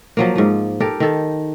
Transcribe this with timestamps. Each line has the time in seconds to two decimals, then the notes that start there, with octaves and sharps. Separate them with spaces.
0.17 F3 F#3 A#3
0.36 G#2 F3
0.80 G4 A4 A#4
1.00 D#3 A4